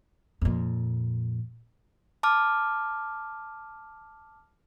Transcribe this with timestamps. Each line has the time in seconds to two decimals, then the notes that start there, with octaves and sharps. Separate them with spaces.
0.41 F2 A#2
2.23 A5 D6 F6